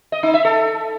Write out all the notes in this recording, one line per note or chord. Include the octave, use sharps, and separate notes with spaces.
D#5
D#4
E5
A4